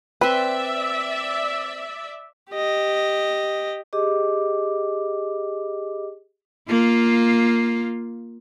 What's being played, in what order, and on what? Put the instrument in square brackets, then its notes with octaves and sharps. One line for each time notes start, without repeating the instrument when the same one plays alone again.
[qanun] C4 C6 [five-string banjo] B4 [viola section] D5 E5
[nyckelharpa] G4 D#5
[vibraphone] G4 G#4 D#5 D6
[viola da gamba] A#3 F4